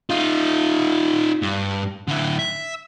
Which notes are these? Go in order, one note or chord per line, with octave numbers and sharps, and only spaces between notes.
D#4 F4
G2
D3 E4
E5